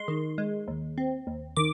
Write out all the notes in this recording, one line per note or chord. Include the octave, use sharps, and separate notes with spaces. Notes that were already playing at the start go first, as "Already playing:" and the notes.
Already playing: G#3 C6
D#3
G#3
D#2
C4
D#2
D#3 D6